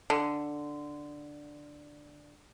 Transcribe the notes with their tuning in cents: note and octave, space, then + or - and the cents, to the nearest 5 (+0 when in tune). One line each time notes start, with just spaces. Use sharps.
D3 +5